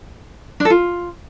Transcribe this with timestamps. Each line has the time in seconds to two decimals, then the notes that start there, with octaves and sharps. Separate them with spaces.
0.60 D4
0.65 A4
0.70 F4